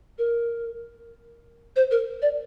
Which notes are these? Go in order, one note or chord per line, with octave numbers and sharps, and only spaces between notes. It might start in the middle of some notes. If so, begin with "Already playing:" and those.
A#4
C5
A#4
D5